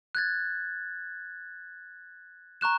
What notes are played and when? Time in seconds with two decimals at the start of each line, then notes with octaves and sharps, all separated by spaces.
0.15 F#6 G#6 A6
2.61 A#5 C#6 F#6 E7